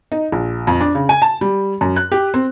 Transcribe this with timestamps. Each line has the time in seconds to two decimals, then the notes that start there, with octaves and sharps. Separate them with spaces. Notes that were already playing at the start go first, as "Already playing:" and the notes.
0.12 D#4
0.32 A#1
0.67 F2
0.80 D4
0.95 C#3
1.09 G#5
1.22 A5
1.41 G3
1.81 F#2
1.96 F#6
2.12 G4
2.34 C4